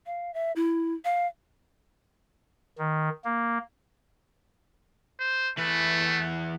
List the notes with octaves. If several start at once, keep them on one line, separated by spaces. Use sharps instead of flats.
F5
E5
E4
F5
D#3
A#3
C5
E2 A3 B4